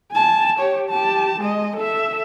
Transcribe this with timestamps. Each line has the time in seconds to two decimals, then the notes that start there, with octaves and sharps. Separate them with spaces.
0.12 G#5 A5
0.59 G4 C#5
0.90 G4 A5
1.41 G#3 D#5
1.77 A4 E5